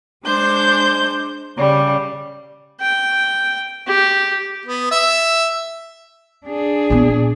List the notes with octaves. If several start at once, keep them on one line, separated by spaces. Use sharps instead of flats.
G#3 D4 C5 G6
C#3 G3
G5
G4
B3
E5
D4 G#4
A#2 B3